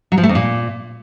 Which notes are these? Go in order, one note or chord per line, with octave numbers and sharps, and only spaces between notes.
F#3
F3
A3
F2
A#2